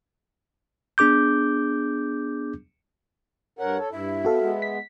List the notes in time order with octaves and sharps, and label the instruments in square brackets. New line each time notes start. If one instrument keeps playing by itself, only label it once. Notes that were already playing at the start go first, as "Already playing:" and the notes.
[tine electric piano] B3 D4 G#4 D6 G6
[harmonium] G2 A#4 F#5 [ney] C#5
[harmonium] A4
[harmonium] G2 E4 [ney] E5
[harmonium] B3 [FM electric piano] F#4 A4 F5
[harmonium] G#3 B3
[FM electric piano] B6